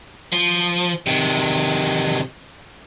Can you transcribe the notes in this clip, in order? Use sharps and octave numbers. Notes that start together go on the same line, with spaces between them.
F3
C3 D#3